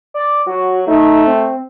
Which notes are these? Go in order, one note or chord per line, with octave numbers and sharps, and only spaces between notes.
D5
F#3 F#4
A3 D#4
C4